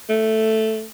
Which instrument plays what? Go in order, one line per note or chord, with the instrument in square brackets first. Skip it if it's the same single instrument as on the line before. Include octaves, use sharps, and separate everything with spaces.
[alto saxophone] A3